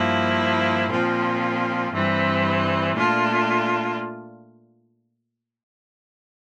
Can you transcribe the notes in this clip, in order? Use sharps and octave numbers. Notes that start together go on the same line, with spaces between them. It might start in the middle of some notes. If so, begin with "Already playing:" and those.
Already playing: G2 F3 A#3 E4
A#2 F3 C4 F4
G2 E3 G3 C4
A#2 A3 D4 F4